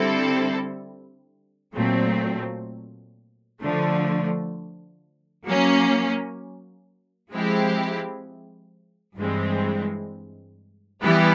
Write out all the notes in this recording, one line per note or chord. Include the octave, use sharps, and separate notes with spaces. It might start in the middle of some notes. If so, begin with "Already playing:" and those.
Already playing: D3 G3 C4 E4 A4
A#2 F#3 A3 C4
D3 F3 A3
F#3 A#3 C#4
F3 G#3 C4 E4 G4
G2 E3 G#3 C4
E3 G3 B3 E4 G4